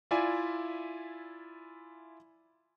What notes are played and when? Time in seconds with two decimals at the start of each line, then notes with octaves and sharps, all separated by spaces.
0.11 E4 F4 D5 E5 G#5